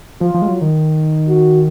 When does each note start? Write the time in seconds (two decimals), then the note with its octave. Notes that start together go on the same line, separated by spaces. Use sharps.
0.21 F3 F4
0.34 F3
0.42 G#3
0.48 F#3
0.61 D#3
1.28 F#4